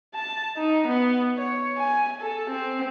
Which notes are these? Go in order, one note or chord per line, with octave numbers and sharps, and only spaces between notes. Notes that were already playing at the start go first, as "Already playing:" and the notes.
A5
D#4
B3
C#5
G#5
A4
C4